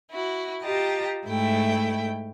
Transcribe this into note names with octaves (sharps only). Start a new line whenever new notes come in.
E4 F#4
F4 G4 D#5 G5 A5 A#5
G#2 A3 E4 G5